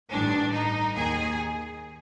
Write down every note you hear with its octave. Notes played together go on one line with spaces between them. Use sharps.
A1 G2 D#3 D4
D#4
D#2 D#3 G#4